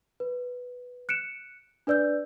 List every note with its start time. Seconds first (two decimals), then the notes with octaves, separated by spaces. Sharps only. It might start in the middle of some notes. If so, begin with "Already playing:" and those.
0.20 B4
1.09 F#6 C#7 D7 E7
1.87 D4 B4 D5 E6 G6